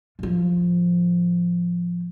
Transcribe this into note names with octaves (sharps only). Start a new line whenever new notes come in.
A2 F3